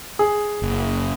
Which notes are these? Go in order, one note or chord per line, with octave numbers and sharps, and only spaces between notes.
G#4
F#1